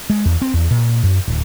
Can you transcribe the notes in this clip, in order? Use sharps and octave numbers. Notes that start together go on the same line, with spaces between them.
G#3
E2
C4
E2
A#2
F#2
D1